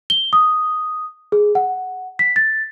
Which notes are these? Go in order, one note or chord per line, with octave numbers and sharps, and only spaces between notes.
G7
D#6
G#4
F#5
B6
A6